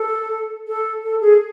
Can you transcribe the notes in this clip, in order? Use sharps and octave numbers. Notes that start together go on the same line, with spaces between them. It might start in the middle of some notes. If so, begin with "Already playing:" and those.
Already playing: A4
A4
A4
G#4